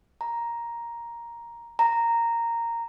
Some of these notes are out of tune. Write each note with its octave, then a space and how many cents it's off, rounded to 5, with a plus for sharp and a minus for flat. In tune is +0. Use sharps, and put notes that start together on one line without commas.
A#5 +5
A#5 -10